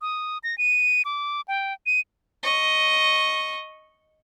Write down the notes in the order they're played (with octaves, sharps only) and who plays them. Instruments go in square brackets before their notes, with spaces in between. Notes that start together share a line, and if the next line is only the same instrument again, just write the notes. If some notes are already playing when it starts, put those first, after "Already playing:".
[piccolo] D#6
A#6
D#7
D6
G5
D#7
[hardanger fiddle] D#5 C#6